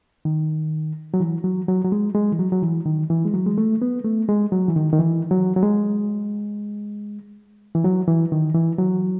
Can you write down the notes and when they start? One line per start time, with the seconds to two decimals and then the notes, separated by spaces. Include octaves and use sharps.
0.25 D#3
1.14 F#3
1.20 E3
1.44 F#3
1.68 F#3
1.85 F#3
1.92 G#3
2.15 G#3
2.32 E3
2.39 F#3
2.52 F#3
2.63 E3
2.86 D#3
3.10 E3
3.25 G#3
3.33 F#3
3.46 G#3
3.58 A3
3.82 B3
4.05 A3
4.29 G#3
4.52 F#3
4.68 E3
4.76 D#3
4.93 D#3
4.99 E3
5.31 F#3
5.56 F#3
5.63 G#3
7.75 E3
7.84 F#3
8.08 E3
8.32 D#3
8.55 E3
8.78 F#3